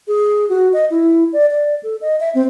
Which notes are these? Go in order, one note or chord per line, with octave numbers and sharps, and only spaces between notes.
G#4
F#4
D#5
E4
D5
D5
A4
D#5
E5
C4